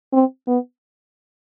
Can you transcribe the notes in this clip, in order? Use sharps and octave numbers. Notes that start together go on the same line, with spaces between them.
C4
B3